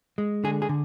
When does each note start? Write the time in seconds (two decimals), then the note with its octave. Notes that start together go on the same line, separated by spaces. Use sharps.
0.18 G#3
0.44 D3 G#4
0.62 G#4
0.69 D3